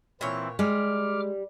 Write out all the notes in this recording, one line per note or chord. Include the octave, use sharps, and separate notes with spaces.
A#2 E3 C4 E4 C#5
G3 G#3 D6 F6